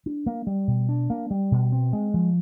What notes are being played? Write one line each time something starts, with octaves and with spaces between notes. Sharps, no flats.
D4
A#3
G3
B2
D4
A#3
G3
B2
C4
G#3
F3